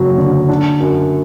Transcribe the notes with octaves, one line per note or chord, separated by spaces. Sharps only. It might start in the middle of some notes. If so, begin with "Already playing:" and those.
Already playing: F#1 F#3
D3
D4
F#2